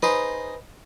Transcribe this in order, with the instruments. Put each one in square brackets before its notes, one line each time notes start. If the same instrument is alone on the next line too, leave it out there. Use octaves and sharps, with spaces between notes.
[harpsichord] D#4 G#4 C5 [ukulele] B4